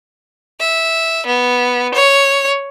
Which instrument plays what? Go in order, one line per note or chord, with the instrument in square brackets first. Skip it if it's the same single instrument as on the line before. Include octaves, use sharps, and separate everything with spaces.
[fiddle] E5
B3
C#5